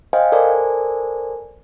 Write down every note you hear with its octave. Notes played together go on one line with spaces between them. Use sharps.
C5 D#5 F5 G5 G#5
A4 A#4 C5 D5 G#5